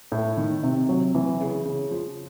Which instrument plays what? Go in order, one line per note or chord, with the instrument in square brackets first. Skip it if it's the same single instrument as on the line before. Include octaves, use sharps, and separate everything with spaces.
[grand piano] A2
D#3
C3
F#3
E3
C#3
C#3
F3